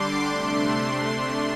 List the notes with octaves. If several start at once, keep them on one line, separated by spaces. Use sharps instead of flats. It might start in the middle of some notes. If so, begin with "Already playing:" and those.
Already playing: D3 G3 D4 C6 D6
C3 A3 D4 C6